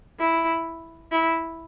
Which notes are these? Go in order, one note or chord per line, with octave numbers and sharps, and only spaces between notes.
E4
E4